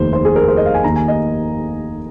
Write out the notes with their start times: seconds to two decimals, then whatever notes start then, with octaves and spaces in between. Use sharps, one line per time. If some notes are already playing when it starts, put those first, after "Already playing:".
Already playing: F1 D#2 D#3 C5
0.13 C5
0.25 G#4
0.36 A#4
0.48 C5
0.57 D#5
0.66 F5
0.74 G#5
0.83 D#2 D#3 A#3 A#5
0.96 G#5
1.08 D#5